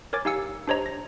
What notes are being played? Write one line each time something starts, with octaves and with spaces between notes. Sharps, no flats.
A#4 C#5 G#5 D6 A6
D#4 G4 F5 G#5 E6 C#7
D4 G4 C5 C#5 D#5 A#5
A#6